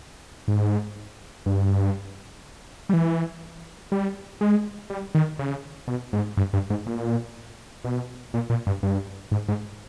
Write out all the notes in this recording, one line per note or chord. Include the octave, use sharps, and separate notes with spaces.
G#2
G2
G3
E3
G3
G#3
G3
D#3
C#3
B2
G#2
G2
G2
G#2
A#2
B2
A#2
A#2
G2
G2
G#2
G#2